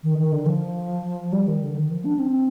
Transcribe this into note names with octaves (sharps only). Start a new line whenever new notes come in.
D#3
D#3
D3
F3
G3
D#3
D3
D#3
F3
D4
C4